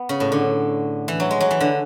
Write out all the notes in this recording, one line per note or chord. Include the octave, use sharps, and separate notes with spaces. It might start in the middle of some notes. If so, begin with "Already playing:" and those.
Already playing: B3
C#3
A2
D3
E3
F#3
G#3
F#3
E3
D3